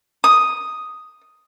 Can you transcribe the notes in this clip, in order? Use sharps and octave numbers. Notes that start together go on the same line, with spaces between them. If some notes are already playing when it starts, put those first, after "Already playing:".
D#6